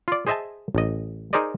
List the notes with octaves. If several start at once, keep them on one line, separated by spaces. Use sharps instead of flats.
F4 D5
G#4 C5 D#5 E5 G#5 A5
A1 D#5
D#4 G#4 A#4 C5 D5 D#5